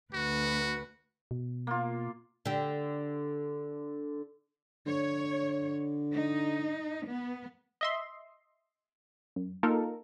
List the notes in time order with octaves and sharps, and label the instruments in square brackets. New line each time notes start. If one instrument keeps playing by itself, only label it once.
[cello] D2 B4 [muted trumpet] F#4
[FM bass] B2
[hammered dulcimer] A#3 F4
[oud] D3 G4
[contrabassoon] D3 [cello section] C#5
[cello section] D#4
B3
[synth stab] D#5 E5 C6
F#2
A#3 D#4 F4 A4 A#4